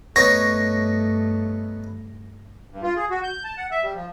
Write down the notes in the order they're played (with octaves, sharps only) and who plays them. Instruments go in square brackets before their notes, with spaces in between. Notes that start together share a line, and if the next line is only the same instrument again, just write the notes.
[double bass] G2 A3 [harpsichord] B3 D#4 C#5 [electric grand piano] A#6
[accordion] G2
F4
G#4
F#4
G6
A5
F#5
E5
G3
F3